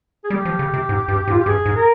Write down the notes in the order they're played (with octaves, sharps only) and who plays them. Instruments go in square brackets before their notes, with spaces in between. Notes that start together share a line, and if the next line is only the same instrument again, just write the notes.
[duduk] G#4
[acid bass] G3 [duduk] G4
[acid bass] F3
C#3
C3
G#2
G2
G#2
[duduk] F4
G4
[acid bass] G2 [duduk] G#4
[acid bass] G#2
[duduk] A#4